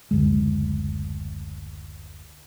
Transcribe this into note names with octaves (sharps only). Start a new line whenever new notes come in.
F#1 D2 G#3